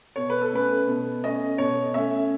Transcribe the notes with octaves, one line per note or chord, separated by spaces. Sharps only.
B2 C#5
B4
A4
A3 C#4 B4
B2
A3 C#4 D#5
B2 C#5
A3 C#4 E5